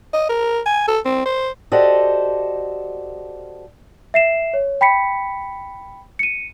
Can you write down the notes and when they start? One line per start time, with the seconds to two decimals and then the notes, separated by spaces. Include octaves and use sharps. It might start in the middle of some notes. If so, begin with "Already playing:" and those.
0.13 D#5
0.29 A#4
0.66 G#5
0.88 A4
1.05 C4
1.26 C5
1.72 F#4 G4 A4 C5 D5 D#5
4.14 E5 C7 E7
4.54 C#5
4.81 G5 B5 B6 C#7
6.19 C#7 D#7